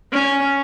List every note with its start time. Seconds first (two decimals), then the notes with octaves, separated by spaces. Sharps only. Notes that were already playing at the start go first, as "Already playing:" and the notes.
0.12 C#4